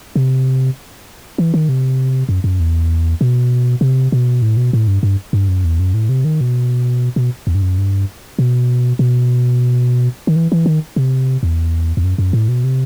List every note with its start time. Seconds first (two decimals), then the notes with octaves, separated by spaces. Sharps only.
0.16 C3
1.38 E3
1.54 D#3
1.69 C3
2.29 F#2
2.44 F#2
2.60 E2
3.21 B2
3.81 C3
4.12 B2
4.42 A2
4.57 B2
4.73 A2
4.88 G2
5.03 G2
5.33 G2
5.48 F#2
5.65 E2
5.80 F#2
5.94 A2
6.09 C3
6.25 D#3
6.41 B2
7.16 B2
7.47 E2
7.55 G2
7.62 F#2
7.78 G2
8.39 B2
8.99 B2
10.27 D#3
10.36 E3
10.52 E3
10.66 D#3
10.96 C3
11.43 E2
11.97 E2
12.04 F#2
12.18 F#2
12.33 A2
12.48 B2
12.64 C3